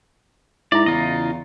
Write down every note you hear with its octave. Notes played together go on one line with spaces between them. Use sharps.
G#2 E4 D5 A#5
E2 C#3 F4 D#5